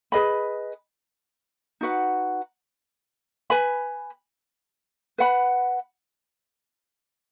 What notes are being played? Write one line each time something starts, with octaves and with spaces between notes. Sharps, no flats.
G#4 B4 D#5 B5
D#4 F#4 B4 F#5
B4 G#5 B5
B4 F#5 B5